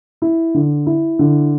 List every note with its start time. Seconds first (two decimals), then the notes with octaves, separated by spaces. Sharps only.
0.22 E4
0.54 D3
0.86 E4
1.19 D3